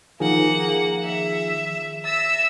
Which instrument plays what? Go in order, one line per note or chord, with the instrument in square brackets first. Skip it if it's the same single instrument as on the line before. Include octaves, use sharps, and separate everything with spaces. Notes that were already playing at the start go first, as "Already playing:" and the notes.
[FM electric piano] D#3 F3 G#4 [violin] A#3 F#5
[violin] E5
[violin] E5 E6 [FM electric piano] A6 A#6